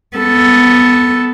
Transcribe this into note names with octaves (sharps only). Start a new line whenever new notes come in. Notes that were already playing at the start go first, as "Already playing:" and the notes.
B3 A4